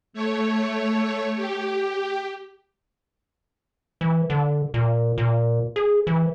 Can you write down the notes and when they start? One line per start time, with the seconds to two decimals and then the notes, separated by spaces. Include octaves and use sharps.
0.13 A3 C#5
1.36 G4
4.01 E3
4.30 D3
4.74 A#2
5.18 A#2
5.76 G#4
6.07 E3